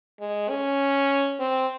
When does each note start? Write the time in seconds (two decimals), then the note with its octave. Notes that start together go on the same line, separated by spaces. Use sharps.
0.20 G#3
0.49 C#4
1.40 C4